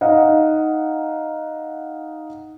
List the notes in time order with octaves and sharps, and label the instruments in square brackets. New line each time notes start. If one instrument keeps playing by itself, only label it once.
[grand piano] D#4 D#5 F5 F#5